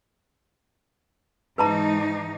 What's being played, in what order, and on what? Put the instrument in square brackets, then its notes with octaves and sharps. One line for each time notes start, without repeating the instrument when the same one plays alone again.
[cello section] G#2 E3 D#4 [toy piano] B4 A5 A#5